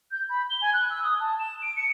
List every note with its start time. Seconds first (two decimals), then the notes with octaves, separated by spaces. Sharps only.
0.11 G6
0.29 B5
0.49 G7
0.61 G#5
0.73 F#6
0.90 E6
1.03 D#6
1.19 A5
1.39 E7
1.62 D7
1.76 C#7